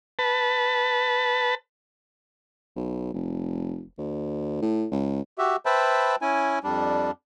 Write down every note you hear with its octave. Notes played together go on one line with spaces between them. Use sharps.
B4 A5
B1
F1
D2
A2
C#2
F#4 G4 E5
B4 C5 E5 G5 A5 B5
C#4 E4 G#5
F2 G3 D4